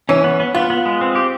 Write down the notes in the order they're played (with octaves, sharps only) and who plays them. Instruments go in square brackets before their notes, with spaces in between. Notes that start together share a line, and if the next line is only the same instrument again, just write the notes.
[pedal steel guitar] E3 [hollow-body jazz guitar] C#4
[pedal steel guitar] B3
B3
[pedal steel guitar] B3 [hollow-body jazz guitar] F4
[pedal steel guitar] B3
G#3
C4
G4